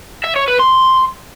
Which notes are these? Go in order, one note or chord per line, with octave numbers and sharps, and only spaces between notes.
E5
C#5
B4
C6